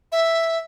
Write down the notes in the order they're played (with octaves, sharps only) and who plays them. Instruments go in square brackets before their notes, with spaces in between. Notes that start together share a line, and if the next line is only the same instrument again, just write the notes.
[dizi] E5